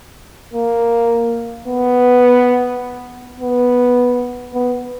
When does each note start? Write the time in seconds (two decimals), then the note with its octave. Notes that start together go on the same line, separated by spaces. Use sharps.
0.53 A#3
1.67 B3
3.40 B3
4.54 B3